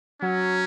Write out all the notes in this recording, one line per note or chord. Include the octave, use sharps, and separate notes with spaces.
F#3 C#4